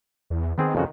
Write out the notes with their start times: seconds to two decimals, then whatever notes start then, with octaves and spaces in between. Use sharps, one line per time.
0.30 E2
0.58 D#3 B3 C4 G#4
0.75 F2 C#3 F#4